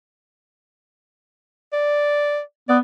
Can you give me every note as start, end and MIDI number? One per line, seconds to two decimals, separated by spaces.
1.73 2.40 74
2.69 2.79 59
2.69 2.77 74